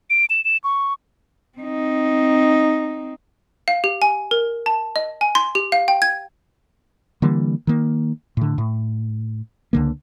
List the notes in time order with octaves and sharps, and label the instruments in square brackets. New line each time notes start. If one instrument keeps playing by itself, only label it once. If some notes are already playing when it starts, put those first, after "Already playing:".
[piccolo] D7
E7
E7
C#6
[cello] C4 D#4
[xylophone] F5
G4
G#5
A#4
A5
D#5
G#5
C6
G4
F5
G5
G#6
[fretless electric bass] D3 E3 G3 A#3
D#3 A#3
A2 D3
A2
C#2 D3 A#3